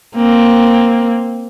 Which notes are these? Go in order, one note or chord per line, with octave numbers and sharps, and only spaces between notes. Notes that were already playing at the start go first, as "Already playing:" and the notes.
A#3 C4